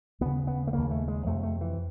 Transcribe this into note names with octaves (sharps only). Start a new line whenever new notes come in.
D#2 C#3 B3
B3
A3
D#2 C#3 A#3
A3
G#3
F2 C3 A3
A3
E3